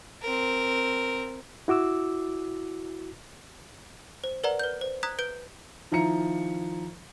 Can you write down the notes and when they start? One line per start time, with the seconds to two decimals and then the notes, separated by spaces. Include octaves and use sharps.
0.22 C4 A#4
1.68 E4 F#4 D6 E6
4.24 C5
4.44 A#4 B4 D5 F#5 A#5
4.59 B4 G6
4.81 C5
5.03 A#5 D#6 F#6 G#6 B6
5.19 B4 G6 D7
5.92 D#3 F3 E4 A#5 C#7